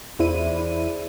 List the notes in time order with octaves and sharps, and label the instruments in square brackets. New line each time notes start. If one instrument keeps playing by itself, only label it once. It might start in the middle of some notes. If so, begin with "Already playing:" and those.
[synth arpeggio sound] E2 E4 D#7 [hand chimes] G#4 C5 D5